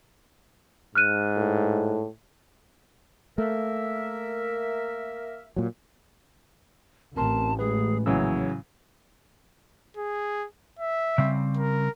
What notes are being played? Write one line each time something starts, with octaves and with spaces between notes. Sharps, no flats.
G#2 F6 F#6 D#7
A2
A3 A#3 A#4 E5
A#2 F#3
A1 C4 A#4 A5 C6
G#3 G#4 B4
A#1 C#3 E3 F#3 A#3 C#5 E6
G#4
E5
C#3 G3 C4
A#4